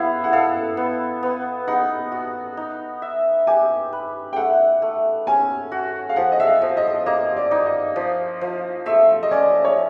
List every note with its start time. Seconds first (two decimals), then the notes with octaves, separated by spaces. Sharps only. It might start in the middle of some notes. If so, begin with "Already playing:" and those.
Already playing: B3 E4 F5 F#5
0.24 F#5
0.33 A4 F5
0.77 B3
1.23 B3
1.68 D#4 F#5
2.12 F#4
2.57 D#4
3.02 E5
3.47 G4 G#5
3.93 B4
4.33 G5
4.36 A3 F#5
4.82 A3
5.27 C#4 G#5
5.72 F#4
6.09 F5
6.16 F3 F#5
6.32 D#5
6.40 E5
6.47 F5
6.62 F3
6.77 D#5
7.06 A#3 D#5
7.36 D5
7.51 D#4
7.66 D#5
7.96 F3
8.41 F3
8.86 A3 E5
9.23 D#5
9.31 C#4 D5
9.65 C#5